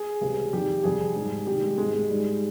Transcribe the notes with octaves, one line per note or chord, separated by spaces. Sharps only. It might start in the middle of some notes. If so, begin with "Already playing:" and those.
Already playing: G#4
C#2 C3 G3
F2 D#3 G3 G4
F2 C3 G3 G#4
G#2 G3
C2 C3 D#3 G3 G4
G#3
G#2 G3 G#3
G#3
G#2 G3